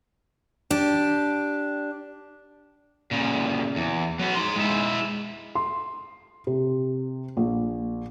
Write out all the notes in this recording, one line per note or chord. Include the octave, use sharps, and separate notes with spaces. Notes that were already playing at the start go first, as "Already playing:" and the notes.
D4 G4
A#2 C#3
E2
F#3 B3
D#4 C6
G#3 E4
C6
C3
A#1